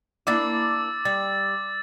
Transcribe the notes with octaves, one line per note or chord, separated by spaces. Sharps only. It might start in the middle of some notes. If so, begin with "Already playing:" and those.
A#3 D4 E4 D6 E6 A6
G3 A6